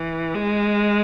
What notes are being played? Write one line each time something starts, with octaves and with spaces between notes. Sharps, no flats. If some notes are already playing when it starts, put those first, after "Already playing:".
Already playing: E3
G#3